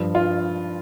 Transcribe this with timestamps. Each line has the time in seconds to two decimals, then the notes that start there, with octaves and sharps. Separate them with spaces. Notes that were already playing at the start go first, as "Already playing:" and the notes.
Already playing: G2 F3
0.15 F4